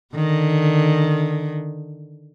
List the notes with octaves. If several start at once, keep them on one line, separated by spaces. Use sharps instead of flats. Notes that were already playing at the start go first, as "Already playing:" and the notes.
D3 D#3